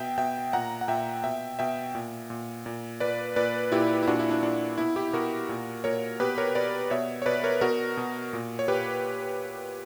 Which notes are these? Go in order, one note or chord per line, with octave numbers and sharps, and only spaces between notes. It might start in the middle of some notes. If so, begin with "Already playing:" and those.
Already playing: B2 E5 G5
B2 E5 G5
A#2 F#5 A#5
F#5
A#2 E5 G5
B2 E5 G5
B2 E5 G5
A#2
A#2
A#2
A#2 B4 D5
A#2 B4 D5
A#2 E4 G4
E4
A#2 D4 F#4
E4
D4
A#2 D4
B2 E4
E4 G4
B2 F#4 A#4
A#2
A#2 A#4 C#5
B2 G4 B4
A#4 C#5
B2 B4 D5
B2 C#5 E5
C#5
B2 B4 D5
A#4 C#5
B2 F#4 A#4
B2
A#2
C#5
A#2 G4 B4